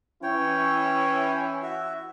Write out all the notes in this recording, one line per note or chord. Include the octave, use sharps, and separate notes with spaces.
E3 C#4 E4 C#5 G5
F#4 E5